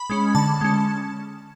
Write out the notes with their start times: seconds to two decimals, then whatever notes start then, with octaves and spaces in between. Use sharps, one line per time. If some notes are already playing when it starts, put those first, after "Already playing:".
Already playing: B5
0.10 G#3 C#4
0.35 D3 A5
0.61 G#3 C#4